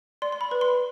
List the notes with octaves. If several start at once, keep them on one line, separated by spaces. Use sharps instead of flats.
D5 C6
C6
B5
B4
C6